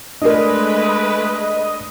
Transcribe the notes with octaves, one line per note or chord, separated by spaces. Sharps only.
G#3 A3 D4 A#4 B4 D#5